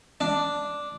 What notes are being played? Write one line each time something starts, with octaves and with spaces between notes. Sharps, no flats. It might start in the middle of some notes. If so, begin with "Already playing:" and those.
D4